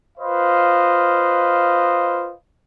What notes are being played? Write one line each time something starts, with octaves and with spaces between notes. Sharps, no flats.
F4 B4 C5 D#5 F5